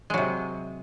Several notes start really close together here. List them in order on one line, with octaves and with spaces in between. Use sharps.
G#3 F#3 C3